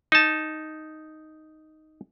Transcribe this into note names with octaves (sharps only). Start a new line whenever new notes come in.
D#4 A5